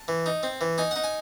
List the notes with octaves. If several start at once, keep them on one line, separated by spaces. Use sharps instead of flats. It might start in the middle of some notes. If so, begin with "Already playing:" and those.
Already playing: A5
E3
D#4
C4
E3
D#4 G#5
D#4 F#5
G#5